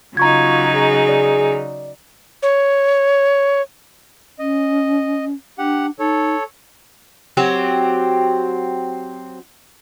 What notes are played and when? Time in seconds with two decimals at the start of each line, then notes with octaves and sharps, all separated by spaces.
0.17 C#3 F#3 D#4 F4 A#5 C#6 G#6
0.75 G#4
1.09 D5
2.42 C#5
4.39 C#4 D#5
5.58 D4 G4 F#5
5.99 D#4 A4 C#5
7.37 F#3 C4 G4